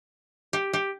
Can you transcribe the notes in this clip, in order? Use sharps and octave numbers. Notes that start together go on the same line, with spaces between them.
G4
G4